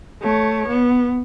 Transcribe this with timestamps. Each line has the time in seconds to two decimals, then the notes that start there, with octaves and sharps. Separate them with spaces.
0.22 A3 C#5
0.68 B3